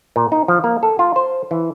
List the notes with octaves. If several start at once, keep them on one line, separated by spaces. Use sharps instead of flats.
A#2
D#4
F3
A#3
A4
F4
C5
E3